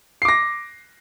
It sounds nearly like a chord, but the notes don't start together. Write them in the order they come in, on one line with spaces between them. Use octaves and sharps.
C7 D6 A#6